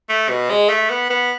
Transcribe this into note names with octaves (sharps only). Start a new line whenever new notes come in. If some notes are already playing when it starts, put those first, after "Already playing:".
A3
B2
G#3
A3
B3
B3